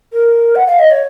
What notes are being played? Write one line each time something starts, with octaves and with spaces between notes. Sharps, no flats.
A#4
F#5
F5
D#5
C#5